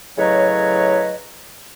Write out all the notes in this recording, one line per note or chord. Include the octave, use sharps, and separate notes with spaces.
A2 C#3 F#3 B4 C#5 D#5